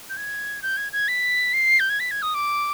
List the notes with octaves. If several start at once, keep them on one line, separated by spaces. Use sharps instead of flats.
G6
G#6
G6
G#6
G#6
B6
C7
G6
G#6
B6
G#6
D#6
D6